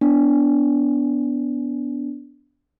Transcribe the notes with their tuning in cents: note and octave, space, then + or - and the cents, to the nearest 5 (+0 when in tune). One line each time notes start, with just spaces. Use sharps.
B3 +0 D4 -20